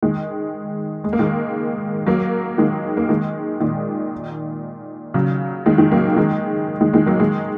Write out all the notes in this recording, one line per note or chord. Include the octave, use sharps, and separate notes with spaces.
D#3 G#3
G#3
A#3
D#3 G#3
F#3 A#3
D#3 G#3
A#3
D#3 G#3
A#2 D#3
C#3 F#3
D#3 G#3
D#3 G#3
F#3 A#3
D#3 G#3
D#3 G#3
D#3 G#3
F#3 A#3
D#3 G#3